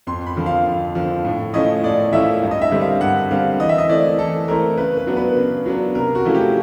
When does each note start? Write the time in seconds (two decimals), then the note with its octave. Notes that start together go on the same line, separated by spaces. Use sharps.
0.07 F2 C6
0.27 B5
0.36 D3 F3
0.46 F5
0.66 F2
0.95 D3 F3
1.24 A2
1.54 F3 A3 C#4 E4 D#5
1.83 A2 D5
2.13 F3 A3 C#4 E4 E5
2.42 G2
2.51 D#5
2.62 E5
2.72 D3 G3 C4
2.81 F5
3.01 G2 F#5
3.31 D3 G3 C4 F5
3.60 E3 D#5
3.69 E5
3.78 D#5
3.89 A3 C4 E4 D5
4.19 E3 A4
4.48 A3 C4 E4 A#4
4.77 C#3 B4
4.97 B4
5.07 F#3 B3 D4
5.17 B4
5.36 C#3
5.66 F#3 B3 D4
5.95 C3 A#4
6.15 F#4
6.25 F3 A3 C#4 E4
6.34 G4